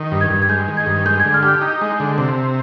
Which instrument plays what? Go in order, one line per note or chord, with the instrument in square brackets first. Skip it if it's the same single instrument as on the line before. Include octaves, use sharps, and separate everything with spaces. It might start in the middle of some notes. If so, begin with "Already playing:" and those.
Already playing: [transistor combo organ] D#3
G2
[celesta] G#6
[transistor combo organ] G2
[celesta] G#6
[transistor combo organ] G#3 [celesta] G6
[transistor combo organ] D#3
[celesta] G#6
[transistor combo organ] G2
[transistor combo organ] G#3 [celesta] G6
[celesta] G#6
[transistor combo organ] D3
[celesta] F6
[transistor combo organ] G4
[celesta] G6
[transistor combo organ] D#4 [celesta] G6
[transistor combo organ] G#3
[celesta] G6
[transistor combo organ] D3
C3